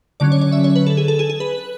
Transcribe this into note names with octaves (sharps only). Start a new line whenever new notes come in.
D3 F#3 C#4 D5
C#5
D5
E5
C#5
B4
A4
G#4
A4
G#4
G#4
B4